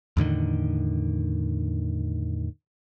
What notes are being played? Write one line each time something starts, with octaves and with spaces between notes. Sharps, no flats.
E2 A2 D3 D#3